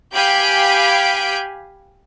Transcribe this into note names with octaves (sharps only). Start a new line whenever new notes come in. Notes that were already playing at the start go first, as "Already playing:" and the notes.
G4 F5 G#5 B5 G6 D7